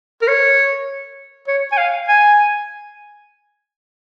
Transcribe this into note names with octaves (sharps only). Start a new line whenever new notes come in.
A#4
C#5
C#5
G#5
F5
G#5